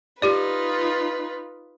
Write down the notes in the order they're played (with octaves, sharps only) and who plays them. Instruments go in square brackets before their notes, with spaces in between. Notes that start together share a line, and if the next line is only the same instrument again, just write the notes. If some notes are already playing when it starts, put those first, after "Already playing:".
[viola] D#4 F4 [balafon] G4 D5 [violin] B4